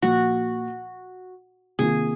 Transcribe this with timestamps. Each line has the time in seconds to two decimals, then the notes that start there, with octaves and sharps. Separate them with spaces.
0.02 A#2 F3 A#3 F#4
1.79 C3 D#3 A#3 F4 G#4